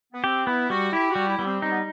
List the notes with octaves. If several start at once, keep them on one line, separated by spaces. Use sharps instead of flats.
B3
C4 G4
B3 E4
G3 F#4
E4 G4
G3 F#4
E4
G3 B3
C4
C4 D#4
B3